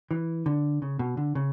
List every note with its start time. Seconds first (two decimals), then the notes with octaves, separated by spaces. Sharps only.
0.11 E3
0.46 D3
0.82 C#3
0.99 B2
1.17 D3
1.35 C#3